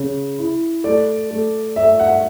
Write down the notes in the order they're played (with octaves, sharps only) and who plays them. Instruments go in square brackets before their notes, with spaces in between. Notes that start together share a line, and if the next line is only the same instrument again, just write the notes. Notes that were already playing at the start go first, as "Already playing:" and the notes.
Already playing: [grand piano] C#3
E4
[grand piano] A3 [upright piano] D5
[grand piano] A3
[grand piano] A3 [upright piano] E5
[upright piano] F#5